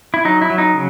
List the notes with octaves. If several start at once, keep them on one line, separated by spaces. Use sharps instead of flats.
E4
F#3 D#4
E4
F#3
D#4
C#3